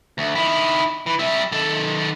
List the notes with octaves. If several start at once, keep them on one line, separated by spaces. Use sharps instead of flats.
D2
D#3 E4
E3
G3 E5
D#3 A4